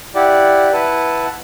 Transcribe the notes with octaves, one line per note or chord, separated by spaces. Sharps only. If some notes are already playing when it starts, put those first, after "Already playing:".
E4 G4 D5 F#5
E4 B4 F#5 A5